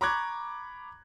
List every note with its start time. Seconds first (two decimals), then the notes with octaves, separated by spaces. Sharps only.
0.01 A#5 B5 C#6 D6 F#6 G#6